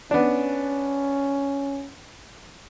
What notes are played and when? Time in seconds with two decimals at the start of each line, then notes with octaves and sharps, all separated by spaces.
0.11 B3 C#4 D4